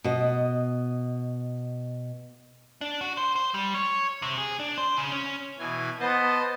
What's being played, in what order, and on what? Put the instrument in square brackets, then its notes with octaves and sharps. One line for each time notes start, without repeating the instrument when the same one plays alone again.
[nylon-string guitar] B2 D#5
[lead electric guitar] D4
F#4
C5
C5
G3
C#5
C3
G#4
D4
C5
C#3
C#4
[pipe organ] B2 E3 G#5
[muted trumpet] B3 [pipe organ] C5 D#5 A5